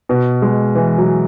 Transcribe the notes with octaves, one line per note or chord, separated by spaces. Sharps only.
B2
G#3
E3
F#3